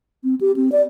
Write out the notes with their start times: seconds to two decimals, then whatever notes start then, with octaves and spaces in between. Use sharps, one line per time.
0.24 C4
0.41 G4
0.56 C4
0.72 D5